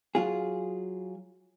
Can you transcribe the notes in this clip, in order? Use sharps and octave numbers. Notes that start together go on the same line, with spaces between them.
F#3 F4 G#4